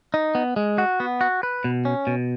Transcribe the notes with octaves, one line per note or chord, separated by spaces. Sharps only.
D#4
B3
G#3
F#4
B3
F#4
B4
B2
C#4
B2